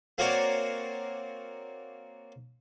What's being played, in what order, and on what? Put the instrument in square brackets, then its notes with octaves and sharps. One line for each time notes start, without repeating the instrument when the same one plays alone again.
[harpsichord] A#3 C4 F#4 A#4 C#5 D5